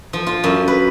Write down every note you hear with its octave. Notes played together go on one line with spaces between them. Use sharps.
F3
F4
F#2
B4